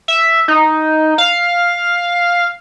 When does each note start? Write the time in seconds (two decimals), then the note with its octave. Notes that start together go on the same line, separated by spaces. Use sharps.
0.08 E5
0.48 D#4
1.18 F5